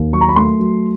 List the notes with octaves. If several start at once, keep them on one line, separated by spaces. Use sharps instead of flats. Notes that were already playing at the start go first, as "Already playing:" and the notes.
Already playing: D#2
F#3 C#6
A#5
B5
A3 C6
F#3